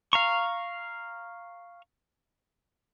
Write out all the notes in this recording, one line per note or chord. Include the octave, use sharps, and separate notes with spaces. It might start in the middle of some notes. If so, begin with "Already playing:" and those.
F5 A#5 C#6